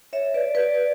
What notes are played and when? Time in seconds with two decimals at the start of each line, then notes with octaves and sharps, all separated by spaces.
0.13 C#5 E5
0.34 B4 D5
0.55 B4 D5